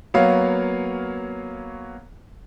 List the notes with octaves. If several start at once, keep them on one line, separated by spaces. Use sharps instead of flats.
F#3 A#3 B3 C#5 F5